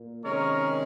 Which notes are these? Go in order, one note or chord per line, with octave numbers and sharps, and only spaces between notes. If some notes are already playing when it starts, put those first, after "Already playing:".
Already playing: A#2
C3 D#3 G#3 C#4 A#4 C#5